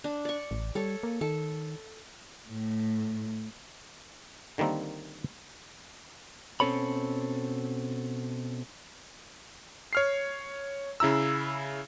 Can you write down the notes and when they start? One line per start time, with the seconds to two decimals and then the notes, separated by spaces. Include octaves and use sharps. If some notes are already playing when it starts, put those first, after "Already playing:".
0.04 D4
0.25 D5 C#6
0.51 A1
0.75 G3 A4 C#5
1.03 A#3
1.21 D#3 A4
2.48 A2
4.58 D3 D#3 G3 A#3 C4
6.60 B2 C4 C#4 A4 C#5 B5
9.93 C#5 F6 C7
11.00 C#3 E4 A#5 E6